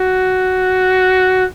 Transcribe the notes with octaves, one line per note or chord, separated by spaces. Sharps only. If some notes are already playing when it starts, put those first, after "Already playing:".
Already playing: F#4